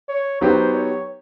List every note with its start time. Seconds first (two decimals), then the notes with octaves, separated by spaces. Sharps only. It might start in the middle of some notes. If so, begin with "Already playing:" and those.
0.09 C#5
0.41 F#3 B3 D#4 G4 C5
0.74 C#5